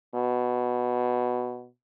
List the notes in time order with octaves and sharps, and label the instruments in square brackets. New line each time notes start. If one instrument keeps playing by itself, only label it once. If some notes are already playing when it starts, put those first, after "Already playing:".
[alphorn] B2